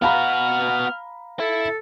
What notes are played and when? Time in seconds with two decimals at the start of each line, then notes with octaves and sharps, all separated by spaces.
0.02 B3 F#4 F5 A#5 B5 F6
1.40 E4 A4